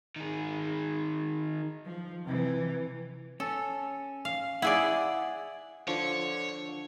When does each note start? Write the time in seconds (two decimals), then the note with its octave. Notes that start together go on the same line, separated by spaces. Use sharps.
0.16 D#3 G#4
1.85 F3
2.24 C3 E3
3.40 C#4 A4
4.25 F5
4.62 E4 G#4 D5 F#5
5.88 D3 F3 C#5